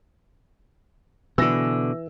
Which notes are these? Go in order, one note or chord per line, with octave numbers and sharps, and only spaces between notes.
B2 D3 E3 E6 A#6